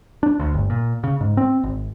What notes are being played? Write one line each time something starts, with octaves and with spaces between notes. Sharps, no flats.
D4
D2
G1
A#2
C#3
G#2
C4
G#1